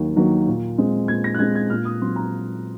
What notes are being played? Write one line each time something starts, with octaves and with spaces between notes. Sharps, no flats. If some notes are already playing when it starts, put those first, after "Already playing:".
Already playing: D#2 D#3 F#3 A#3
D#3 F#3 A#3
A#2
G#3 C4
A#2 G#6
A#6
F#6
G#3 C4 G#6
G#6
A#2 F6
D#6
F#3 C4 C6
A#5